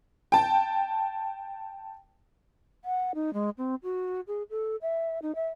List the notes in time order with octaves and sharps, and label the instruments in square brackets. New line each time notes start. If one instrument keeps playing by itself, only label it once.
[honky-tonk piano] G5 A5
[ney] F#5
D#4
G#3
C4
F#4
G#4
A4
E5
D#4
E5